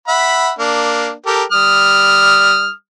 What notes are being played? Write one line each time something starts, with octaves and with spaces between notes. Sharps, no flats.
E5 F#5 B5
A#3 D4
G4 A4 A#4
G3 D#6 F6